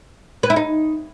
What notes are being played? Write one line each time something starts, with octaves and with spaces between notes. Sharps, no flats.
B4
E4
D#4